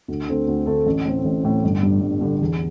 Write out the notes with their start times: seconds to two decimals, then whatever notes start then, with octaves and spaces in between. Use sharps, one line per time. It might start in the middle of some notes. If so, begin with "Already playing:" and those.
0.08 D2
0.27 D3 A3 C4 A4
0.48 D2
0.66 D3 A3 C4 A4
0.86 A1
1.05 A2 A3 C4
1.25 A1
1.44 A2 A3 C4
1.64 G1
1.83 G2 D3
2.01 G1
2.21 G2 D3
2.41 E2